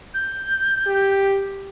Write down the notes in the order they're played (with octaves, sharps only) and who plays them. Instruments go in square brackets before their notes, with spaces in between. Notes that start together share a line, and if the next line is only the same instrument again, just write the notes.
[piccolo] G6
[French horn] G4